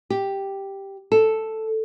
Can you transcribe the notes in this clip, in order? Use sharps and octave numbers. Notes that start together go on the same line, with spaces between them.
G4
A4